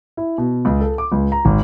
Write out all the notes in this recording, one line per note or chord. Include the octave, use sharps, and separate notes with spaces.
E4
B2
C#2
A4
D6
C#2
A#5
G#1